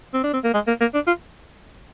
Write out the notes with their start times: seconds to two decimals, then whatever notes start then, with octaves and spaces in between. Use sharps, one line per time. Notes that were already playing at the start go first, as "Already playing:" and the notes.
0.14 C4
0.24 D4
0.33 C4
0.44 A#3
0.54 G#3
0.67 A#3
0.81 A#3
0.94 D4
1.07 F4